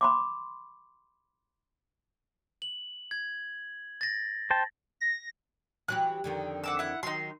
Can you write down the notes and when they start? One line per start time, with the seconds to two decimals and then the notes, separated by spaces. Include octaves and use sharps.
0.01 B5 C6 D6
2.62 F#7
3.11 G#6
4.01 A6 A#6
4.50 C5 G5 A5
5.01 A#6
5.88 E3 F#3 G4 F#6
6.24 F2 D3 D#3
6.64 F#5 D6 E6
6.79 E4 F#5
7.03 D#3 F#3 D#4 C6